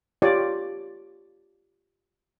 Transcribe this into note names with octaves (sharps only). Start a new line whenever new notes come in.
F4 G4 C#5 D5